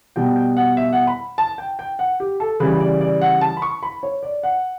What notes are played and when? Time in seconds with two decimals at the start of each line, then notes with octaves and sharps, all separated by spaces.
0.16 B2 G3 G5
0.36 G5
0.57 F#5
0.77 E5
0.93 F#5
1.07 B5
1.38 A5
1.58 G5
1.79 G5
1.99 F#5
2.20 G4
2.40 A4
2.60 C#3 E3 G3 B4
2.80 D5
3.01 D5
3.22 F#5
3.41 A5
3.57 B5
3.62 C#6
3.83 B5
4.03 C#5
4.23 D5
4.43 F#5